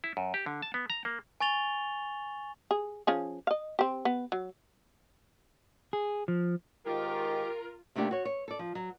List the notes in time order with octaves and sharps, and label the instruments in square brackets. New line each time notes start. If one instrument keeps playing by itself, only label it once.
[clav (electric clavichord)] E4
F#2
G4
D3
A5
B3
A#5
A#3
[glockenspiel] G#5 C#6 A6 F7 G7
[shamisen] G#4
F3 C#4 G#4
D#5 F5
C4 G4
B3
F#3
[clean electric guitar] G#4
F3
[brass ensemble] G#2 D#3 [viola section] F4 [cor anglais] G4 [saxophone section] A#4
[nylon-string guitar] C3 A3 A#3 D4 G4
F#4 C#5
C#5
A4 D5
F3
F#3